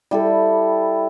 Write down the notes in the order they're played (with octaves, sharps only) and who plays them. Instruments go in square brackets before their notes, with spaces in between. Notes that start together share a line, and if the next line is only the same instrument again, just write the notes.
[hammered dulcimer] G3 E4 A4